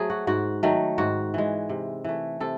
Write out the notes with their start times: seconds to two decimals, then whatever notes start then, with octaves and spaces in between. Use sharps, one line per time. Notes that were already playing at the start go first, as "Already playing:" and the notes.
Already playing: F#3 A3 G#4 C5
0.10 F#4
0.27 G#2 F#4
0.63 D#3 F#3 A3
0.98 G#2 F#4
1.34 E3 G#3
1.69 C3
2.04 E3 A3
2.40 C3 A4